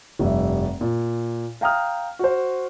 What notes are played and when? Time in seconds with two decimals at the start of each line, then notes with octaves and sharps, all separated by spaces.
0.19 F1 G2 E5
0.81 A#2
1.61 F5 G5 A#5 D#6 F6
2.19 F#4 C5